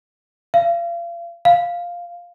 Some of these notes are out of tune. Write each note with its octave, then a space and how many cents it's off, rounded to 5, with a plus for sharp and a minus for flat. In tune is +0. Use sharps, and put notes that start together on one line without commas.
F5 -35
F5 +0